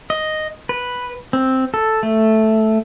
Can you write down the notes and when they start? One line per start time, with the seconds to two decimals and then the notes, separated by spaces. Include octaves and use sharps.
0.10 D#5
0.69 B4
1.33 C4
1.74 A4
2.03 A3